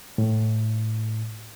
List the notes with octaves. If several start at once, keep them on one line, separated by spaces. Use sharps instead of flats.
A2